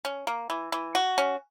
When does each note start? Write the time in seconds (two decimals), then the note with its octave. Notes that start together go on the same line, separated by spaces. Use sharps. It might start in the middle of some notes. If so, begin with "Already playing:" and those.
0.05 C#4
0.27 A#3
0.50 E3
0.72 E3
0.95 F#4
1.18 C#4